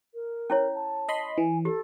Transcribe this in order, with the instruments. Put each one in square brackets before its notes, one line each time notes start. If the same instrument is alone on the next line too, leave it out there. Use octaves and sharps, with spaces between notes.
[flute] A#4
[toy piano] C#4 E4 C#5
[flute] A5
[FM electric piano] D#5 B5 C6
[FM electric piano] E3 [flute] G#5
[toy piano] G4 [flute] A4